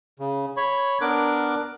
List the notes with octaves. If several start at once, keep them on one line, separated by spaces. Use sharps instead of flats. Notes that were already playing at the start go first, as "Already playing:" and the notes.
C#3
C#5 B5 C#6
B3 D4 A#4 D6 F#6